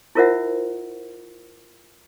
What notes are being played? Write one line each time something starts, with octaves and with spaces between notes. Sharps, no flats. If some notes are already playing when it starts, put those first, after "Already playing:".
E4 F4 A#4 C5 E5 F#5